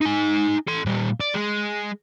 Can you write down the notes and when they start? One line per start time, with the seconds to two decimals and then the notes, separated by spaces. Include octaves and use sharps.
0.02 D#4 G#5
0.68 A4 C6
0.86 A#2 G3
1.21 D5
1.34 G#3